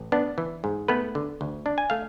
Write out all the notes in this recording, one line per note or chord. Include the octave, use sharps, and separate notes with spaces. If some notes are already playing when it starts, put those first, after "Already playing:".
Already playing: A1
B3 D4
E3
G#2
A3 B3 B4
D3
D2
D4
G#5
A3 F5